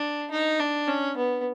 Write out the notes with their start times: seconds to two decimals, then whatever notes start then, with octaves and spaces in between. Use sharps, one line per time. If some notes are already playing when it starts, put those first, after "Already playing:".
Already playing: D4
0.31 D#4
0.59 D4
0.88 C#4
1.17 B3